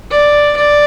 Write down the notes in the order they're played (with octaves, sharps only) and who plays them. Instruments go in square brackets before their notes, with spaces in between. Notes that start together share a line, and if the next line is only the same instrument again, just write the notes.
[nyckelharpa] D5
D5